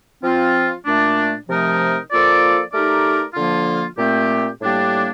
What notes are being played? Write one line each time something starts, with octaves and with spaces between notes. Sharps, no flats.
F3 C4 F4
A#2 A3 D4
C3 F3 A3 D#4 A#4
F3 A#3 F4 A4 D5
A3 D#4 G4 A#4 D5
D3 F3 A#3 F4
A#2 A3 C4 G4
A2 G3 A#3 D4 G4